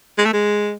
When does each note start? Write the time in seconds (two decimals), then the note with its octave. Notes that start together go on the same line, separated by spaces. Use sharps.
0.18 G#3
0.25 A3
0.33 G#3